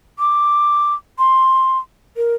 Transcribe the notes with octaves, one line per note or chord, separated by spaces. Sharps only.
D6
C6
A#4